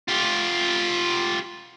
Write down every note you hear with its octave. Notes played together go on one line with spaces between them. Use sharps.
F4 G4